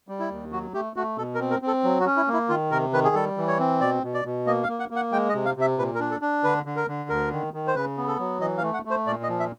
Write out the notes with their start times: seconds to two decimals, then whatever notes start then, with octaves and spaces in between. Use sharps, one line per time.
0.08 G3
0.19 E4
0.31 D#2
0.52 F#3 F#4
0.74 A3 G4
0.96 A3 F#4
1.18 B2 A4
1.35 A#4
1.40 C4
1.51 A#4
1.62 C4
1.67 A4
1.84 F#3
2.00 F#4
2.06 C#4
2.17 E4
2.28 A#3
2.33 E4
2.49 D#3 F4
2.71 C3 A#4
2.93 D#3 B4
3.04 G#4
3.15 G3 A4
3.37 E3
3.48 C#5
3.59 C4
3.81 B2 D5
4.03 B2
4.14 D5
4.25 B2
4.46 A#3 D#5
4.63 F5
4.68 A#3
4.80 F#5
4.90 A#3
4.96 F#5
5.12 G#3 G5
5.29 D#5
5.35 C3
5.45 F5
5.57 C3 E5
5.78 A#2 B4
5.95 A#4
6.00 D4
6.11 A4
6.22 D4
6.44 D3 B4
6.66 D3
6.76 A#4
6.88 D3
7.09 D2 A#4
7.32 D#3
7.54 D#3
7.67 C5
7.75 C#3 B4
7.97 B3
8.08 A4
8.19 F#3
8.41 E3 D#5
8.57 F5
8.63 A3
8.74 F#5
8.85 A3
8.91 C5
9.07 A#2 D5
9.23 D#5
9.29 F3
9.40 E5